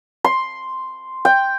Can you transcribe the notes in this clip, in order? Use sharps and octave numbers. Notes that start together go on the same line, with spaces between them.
C6
G5